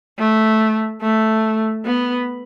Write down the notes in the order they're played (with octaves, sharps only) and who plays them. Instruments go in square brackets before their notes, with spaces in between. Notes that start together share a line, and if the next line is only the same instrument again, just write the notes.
[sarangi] A3
A3
B3